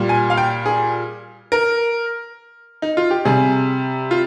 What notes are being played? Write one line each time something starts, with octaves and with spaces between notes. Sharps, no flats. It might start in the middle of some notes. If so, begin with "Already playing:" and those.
Already playing: A#2 G3
G#5
F5
G5
G#4
A#4
D#4
F4
G4
C3 G3 G#4
F4